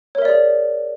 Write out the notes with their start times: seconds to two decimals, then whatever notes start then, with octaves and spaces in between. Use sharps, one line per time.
0.15 C#5
0.18 A#4
0.22 E5
0.25 D5
0.29 G#4